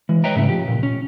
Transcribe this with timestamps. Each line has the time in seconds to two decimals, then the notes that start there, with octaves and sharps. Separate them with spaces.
0.09 E3 G#3
0.24 B4 C#5 D#5 E5 G5 A#5
0.35 G#2 C#3 A3 E4
0.49 F3 G4
0.68 C#2 G2 A#2
0.83 C#4